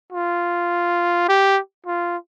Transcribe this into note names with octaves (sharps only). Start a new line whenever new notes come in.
F4
G4
F4